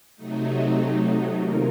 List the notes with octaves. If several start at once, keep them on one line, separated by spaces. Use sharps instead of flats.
C3 F#3 A3 D#4
C3 D#3 A#3 F4 A#4